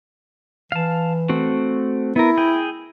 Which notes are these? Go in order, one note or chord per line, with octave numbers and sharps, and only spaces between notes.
E3 F5 A5
A3 C4 F#4
B3 E4 A#4
G#4 G5